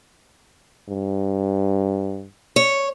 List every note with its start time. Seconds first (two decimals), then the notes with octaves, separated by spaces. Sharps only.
0.89 G2
2.56 C#5